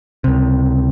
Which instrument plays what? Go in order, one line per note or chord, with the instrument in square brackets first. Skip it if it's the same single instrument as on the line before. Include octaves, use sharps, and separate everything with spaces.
[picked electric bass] C#2 C3